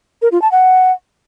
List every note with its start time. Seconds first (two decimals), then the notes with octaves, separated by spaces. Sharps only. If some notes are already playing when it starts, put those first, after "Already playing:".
0.22 A#4
0.32 F4
0.42 A5
0.52 F#5